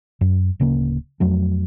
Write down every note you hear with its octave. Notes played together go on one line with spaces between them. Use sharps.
F#2
D1 C#3 A#3
F2 F#3 A3